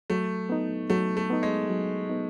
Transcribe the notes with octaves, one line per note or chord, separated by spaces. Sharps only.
F#3 A3
B3 D#4
F#3 A3
A3
B3 D#4
G#3
F#3
B3 D#4